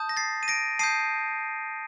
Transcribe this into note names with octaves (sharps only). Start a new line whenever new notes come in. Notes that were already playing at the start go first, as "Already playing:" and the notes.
Already playing: A5 D#6 G6
A#6
A6 C7
D#7
A#6 D7
A5 D#6 G6 C7 D#7